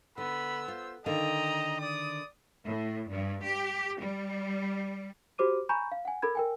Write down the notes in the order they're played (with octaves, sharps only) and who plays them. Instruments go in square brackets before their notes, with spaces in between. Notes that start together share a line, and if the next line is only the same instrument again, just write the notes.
[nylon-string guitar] D3 [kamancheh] B3 E6 [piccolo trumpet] B5
[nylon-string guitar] F4 [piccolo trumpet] C5
[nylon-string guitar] D3 D#3 F5 [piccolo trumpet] D#5 [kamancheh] G5 A#5
[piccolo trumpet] D5 [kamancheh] D#6
[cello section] A2
G2
G4
G3
[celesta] F#4 G4 C5 D6 D#7
G#5 A#5 B5 C#6 G6
F5
F#5 G#5
A4 A#4 B5 G#6
A#4 G5 G#5